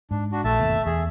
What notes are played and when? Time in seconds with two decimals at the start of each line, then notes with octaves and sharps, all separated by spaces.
0.11 G#2 D4
0.32 D4 F#4
0.44 A#1 A3 E5 A5
0.60 G1 D#2 B2
0.86 E2 G#4 E5